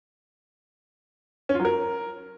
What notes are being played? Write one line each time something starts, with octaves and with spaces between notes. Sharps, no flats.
C#4
F4
F#3
A#4